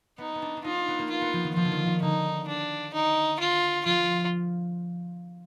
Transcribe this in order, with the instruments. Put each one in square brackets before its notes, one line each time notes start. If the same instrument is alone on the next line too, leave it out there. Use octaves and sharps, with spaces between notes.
[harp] B3 [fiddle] D#4
[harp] B3
D4
D4
[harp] D#4 [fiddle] F4
[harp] B3
A#3
[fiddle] F4
[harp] B3
F3
D#3
[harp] F3 [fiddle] F4
[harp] D3
D#3
D#3
[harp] D3 [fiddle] D#4
[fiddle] D4
D#4
F4
[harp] F3 [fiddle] F4